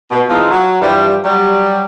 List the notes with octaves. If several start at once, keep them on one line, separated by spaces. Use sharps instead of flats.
B2
E3 F3 G#3 C4 D#4 F4
F#3
G2 E3 F3 G3
F#3 G3